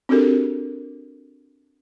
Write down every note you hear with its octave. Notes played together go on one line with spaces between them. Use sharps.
C4 D4 F#4 G4 A4 A#4